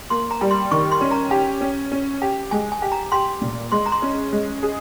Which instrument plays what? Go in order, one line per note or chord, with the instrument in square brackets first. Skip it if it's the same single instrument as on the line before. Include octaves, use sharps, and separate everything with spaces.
[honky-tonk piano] A#3 [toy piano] C6
[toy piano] A#5
[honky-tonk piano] G3
[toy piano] C6
[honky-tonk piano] D#3 [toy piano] C#6
[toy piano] C6
[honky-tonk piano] C#4
[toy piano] A#5
[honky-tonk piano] G4
C#4
C#4
G4
[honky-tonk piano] G#3 [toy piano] G#5
[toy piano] G#5
[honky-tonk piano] G4
[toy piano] A#5
[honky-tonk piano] G4 [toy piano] C6
[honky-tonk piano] A#2
[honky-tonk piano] G#3 [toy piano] C6
[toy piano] A#5
C6
[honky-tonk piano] C#4
G#3
G#4